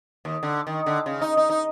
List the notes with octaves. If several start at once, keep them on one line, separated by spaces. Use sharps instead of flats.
D#2
D3
D#3
D3
C#3
D#4
D#4
D#4